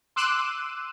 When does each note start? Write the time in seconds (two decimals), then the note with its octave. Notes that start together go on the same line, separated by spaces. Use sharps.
0.16 C6 D6 E6 F#6 D#7 E7